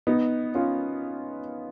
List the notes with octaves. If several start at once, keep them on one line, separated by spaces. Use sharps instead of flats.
B3 D#4
C#4 F4